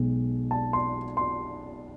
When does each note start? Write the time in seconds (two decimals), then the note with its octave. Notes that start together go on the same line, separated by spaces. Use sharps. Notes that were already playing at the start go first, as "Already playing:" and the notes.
Already playing: B1 B2 G#3
0.51 A5
0.73 C6
1.17 C6